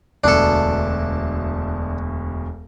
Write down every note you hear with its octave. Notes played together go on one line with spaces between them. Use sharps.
E1 D2 B2 D4 A4